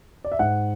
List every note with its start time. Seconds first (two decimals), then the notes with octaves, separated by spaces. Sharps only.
0.24 D5
0.32 E5
0.39 G#2 F#5